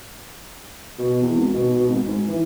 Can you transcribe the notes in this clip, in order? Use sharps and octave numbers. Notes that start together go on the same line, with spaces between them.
B2
E2
G#1
B2
B2
G#1
G#2
E3